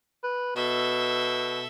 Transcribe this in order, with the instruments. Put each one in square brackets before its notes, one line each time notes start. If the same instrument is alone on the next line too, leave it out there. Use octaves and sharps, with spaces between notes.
[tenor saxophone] B4
[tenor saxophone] B2 [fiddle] A4 E5